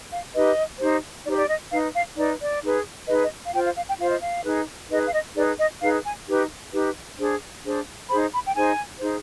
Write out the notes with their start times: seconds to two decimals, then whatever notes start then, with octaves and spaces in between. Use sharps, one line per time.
0.12 F5
0.34 D#4 G4 B4 D#5
0.80 D#4 G4 C5
1.25 D#4 G4 C5 D5
1.37 D5
1.48 D#5
1.71 D#4 B4 F5
1.94 F5
2.16 D#4 B4 D5
2.41 D5
2.62 D#4 G#4 B4
3.08 D#4 G#4 B4 D#5
3.23 D#5
3.46 F5
3.53 F4 C5 G5
3.65 F5
3.76 F5
3.88 G5
3.99 F4 C5 F5
4.10 D#5
4.20 F5
4.45 D#4 G#4 B4
4.90 D#4 G#4 B4 D#5
5.06 F5
5.13 D#5
5.36 D#4 G#4 B4 D5
5.59 D#5
5.81 D#4 G#4 B4 F5
6.05 G#5
6.28 D#4 G4 B4
6.73 D#4 G4 B4
7.18 D4 G#4 C5
7.64 D4 G#4 C5
8.09 D#4 G#4 C5 B5
8.33 B5
8.46 G5
8.55 D#4 G#4 C5 G#5
9.00 D#4 G#4 C5